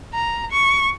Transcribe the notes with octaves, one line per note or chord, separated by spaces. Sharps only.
A#5
C#6